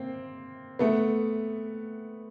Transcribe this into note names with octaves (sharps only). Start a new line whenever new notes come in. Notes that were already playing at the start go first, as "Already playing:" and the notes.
Already playing: A#3 C4
A3 B3